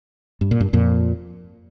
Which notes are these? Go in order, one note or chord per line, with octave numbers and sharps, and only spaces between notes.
G2
A#2
G2
F2 A#2